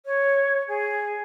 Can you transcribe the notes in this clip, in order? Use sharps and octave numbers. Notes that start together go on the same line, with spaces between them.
C#5
G#4